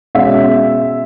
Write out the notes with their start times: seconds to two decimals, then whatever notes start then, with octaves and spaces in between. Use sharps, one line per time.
0.15 B2 G#3 C#4 E5